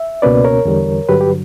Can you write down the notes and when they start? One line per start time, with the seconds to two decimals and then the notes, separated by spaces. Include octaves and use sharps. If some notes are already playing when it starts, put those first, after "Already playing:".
Already playing: E5
0.22 C#2 B2 A#3 C#4 B4 D5
0.44 A#4 C#5
0.65 E2 D3 G3
1.09 G2 D3 F#3 G4 B4
1.21 G4